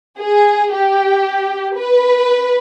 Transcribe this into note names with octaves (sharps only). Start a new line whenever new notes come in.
G#4
G4
B4